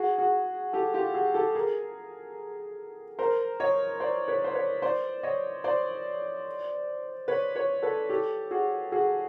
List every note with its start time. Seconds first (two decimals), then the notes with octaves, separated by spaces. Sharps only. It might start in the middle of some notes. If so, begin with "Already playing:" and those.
Already playing: F#4 G#4
0.18 F#4 G#4
0.73 G4 A4
0.94 F4 G4
1.14 F#4 G#4
1.34 G4 A4
1.55 G#4 A#4
3.19 A#4 C5
3.60 C#5 D#5
4.00 C5 D5
4.28 B4 C#5
4.44 C5
4.55 B4 C#5
4.82 C5 D5
5.23 C#5 D#5
5.64 C5 D5
7.28 B4 C#5
7.55 B4 C#5
7.82 A4 B4
8.09 G4 A4
8.51 F#4 G#4
8.92 F#4 G#4